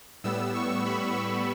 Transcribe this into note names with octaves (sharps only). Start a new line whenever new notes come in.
A2 G3 B3 E6
C#6
B5
C#6